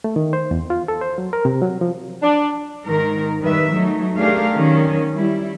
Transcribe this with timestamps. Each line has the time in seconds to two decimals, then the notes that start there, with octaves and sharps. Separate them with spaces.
0.04 A3
0.16 D#3
0.33 C5
0.51 E2
0.70 F4
0.88 A4
1.01 C5
1.18 F#3
1.33 A#4
1.45 C3
1.62 F#3
1.81 F3
2.22 D4
2.85 G#2 D#3 A#4
3.42 D#3 G3 B4 E5
3.72 F#3 A3 D#4
4.16 A3 D4 G4 G#4 A#4 F5
4.56 D#3 F#3 C#4
5.14 G3 E4